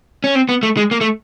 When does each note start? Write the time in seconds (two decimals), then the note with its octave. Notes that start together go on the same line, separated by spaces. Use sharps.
0.24 C#4
0.35 C4
0.49 B3
0.63 A3
0.77 G#3
0.91 A#3
1.01 A3